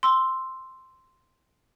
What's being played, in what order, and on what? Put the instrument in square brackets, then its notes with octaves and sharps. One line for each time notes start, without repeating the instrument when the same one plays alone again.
[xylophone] C6 E6